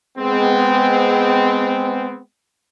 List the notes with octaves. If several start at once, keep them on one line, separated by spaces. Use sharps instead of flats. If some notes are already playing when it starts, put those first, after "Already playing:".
G#3 B3 C4